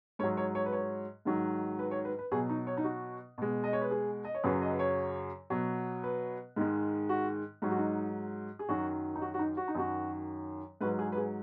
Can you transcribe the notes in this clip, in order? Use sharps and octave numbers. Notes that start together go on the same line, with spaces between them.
G#2 F#3 C#5
C#5
C#5
B4
C#5
G#2 D#3 F#3
B4
C#5
B4
B4
B2 F#3 G#4
D#4
C#5
D#4
F#4
B2 G#3
D#5
C#5
B4
G#4
D#5
C#5
F#2 C#3 F#3 B4
D#5
B4
C#5
B2 F#3
B4
G#2 D#3 G#3
F#4
G#2 F#3 D#4
F#4
D#4
G#4
F#2 D#3 F#3 F#4
D#4
F#4
F#4
D#4
F#4
D#4
F#2 D#3 F#3 F#4
G#2 F#3 B4
G#4
B4
G#4